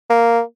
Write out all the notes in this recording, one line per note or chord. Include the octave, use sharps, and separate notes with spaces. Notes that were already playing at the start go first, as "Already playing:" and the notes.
A#3